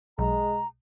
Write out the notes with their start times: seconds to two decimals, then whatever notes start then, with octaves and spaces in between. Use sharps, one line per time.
0.19 B1 G#3 A#5